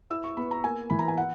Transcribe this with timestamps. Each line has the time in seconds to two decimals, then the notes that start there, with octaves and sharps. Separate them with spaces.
0.10 E4 E6
0.24 C#6
0.37 B3 B5
0.51 A#5
0.64 A#3 G#5
0.90 E3 B5
0.99 A#5
1.08 G#5
1.17 F#5